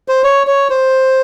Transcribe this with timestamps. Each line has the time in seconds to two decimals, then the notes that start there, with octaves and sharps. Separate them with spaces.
0.08 C5
0.24 C#5
0.47 C#5
0.70 C5